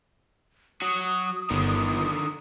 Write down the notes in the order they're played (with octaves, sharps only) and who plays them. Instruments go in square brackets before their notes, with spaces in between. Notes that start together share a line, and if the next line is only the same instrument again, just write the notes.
[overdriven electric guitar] F#3 F#4 [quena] D#6
[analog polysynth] G1 [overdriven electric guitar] D3 D#3